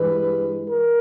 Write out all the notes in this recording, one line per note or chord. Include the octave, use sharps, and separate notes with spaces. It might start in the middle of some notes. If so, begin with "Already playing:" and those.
Already playing: G2 E3 G#3 B4
A#4